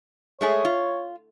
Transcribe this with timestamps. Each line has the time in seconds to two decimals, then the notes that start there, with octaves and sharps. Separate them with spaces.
0.41 G#3 A3 G#4 C#5
0.65 F4